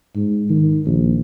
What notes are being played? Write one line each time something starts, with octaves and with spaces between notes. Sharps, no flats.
G#2
D#3
A#1